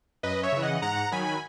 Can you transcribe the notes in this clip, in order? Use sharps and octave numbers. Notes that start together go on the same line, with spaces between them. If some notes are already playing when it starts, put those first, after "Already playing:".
F#2 B4 D#5
C#5 E5
C#3 E3
D#5 F#5
G#2 F#5 A#5
D#3 F#3 G#5 B5